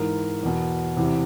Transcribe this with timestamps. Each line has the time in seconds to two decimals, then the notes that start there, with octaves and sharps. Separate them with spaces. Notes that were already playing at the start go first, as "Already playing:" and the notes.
Already playing: G#2 E3 A#4
0.43 E2 B2
0.97 E2 C3 E3